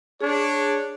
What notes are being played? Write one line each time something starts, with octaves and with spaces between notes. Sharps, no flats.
D4 G#4 C#5